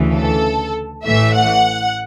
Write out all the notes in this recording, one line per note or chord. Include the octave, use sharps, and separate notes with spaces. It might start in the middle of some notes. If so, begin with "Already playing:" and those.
Already playing: D2 C#3 E3
A4
A1 A2 E3 A3 E5
F#5